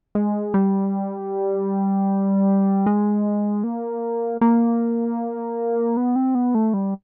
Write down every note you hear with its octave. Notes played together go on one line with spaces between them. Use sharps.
G#3
G3
G#3
A#3
A#3
B3
C4
B3
A3
G3